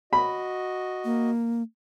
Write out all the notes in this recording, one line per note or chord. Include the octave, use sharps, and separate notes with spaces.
F#4 D#5 B5
A#3